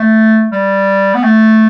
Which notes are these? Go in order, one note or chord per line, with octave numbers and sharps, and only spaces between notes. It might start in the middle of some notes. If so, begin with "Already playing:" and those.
Already playing: A3
G3
B3
A3